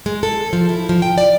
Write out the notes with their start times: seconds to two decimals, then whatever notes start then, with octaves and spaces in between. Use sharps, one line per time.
0.06 G#3
0.23 A4
0.53 F3
0.69 E4
0.89 F3
1.02 G5
1.18 D5